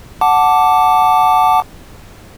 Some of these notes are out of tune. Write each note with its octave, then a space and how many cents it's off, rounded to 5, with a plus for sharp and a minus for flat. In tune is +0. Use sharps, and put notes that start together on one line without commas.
F#5 +0 A5 +0 D6 -5